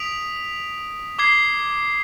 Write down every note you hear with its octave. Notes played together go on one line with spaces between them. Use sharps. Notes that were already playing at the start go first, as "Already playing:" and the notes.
Already playing: D#6 B6 D7 F7
D6 G#6 C7 G7